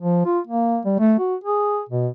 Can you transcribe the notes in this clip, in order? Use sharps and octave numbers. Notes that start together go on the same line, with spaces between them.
F3
F4
A#3
G3
A3
F#4
G#4
B2